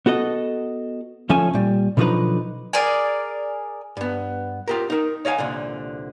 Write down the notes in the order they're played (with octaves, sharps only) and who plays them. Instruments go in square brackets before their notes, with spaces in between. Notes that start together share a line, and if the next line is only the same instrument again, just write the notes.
[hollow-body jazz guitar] B3 F#4 A4 D#5
D2 F3 C#4 A4 C#5 G#5
A#2 G3
B2 D3 F3 F#3 D#4 B4
[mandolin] G#4 A#4 D5 G#5
[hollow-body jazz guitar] G2 B3
F4 G4 A#4
D#4 A#4
C#5 D#5 F5 G#5
C2 A#2 D3